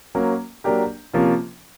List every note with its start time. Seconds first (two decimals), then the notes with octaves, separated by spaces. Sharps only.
0.15 F#3 A#3 C#4
0.64 F#3 A#3 D4 G4 A#4
1.13 C3 F3 A#3 C#4 F4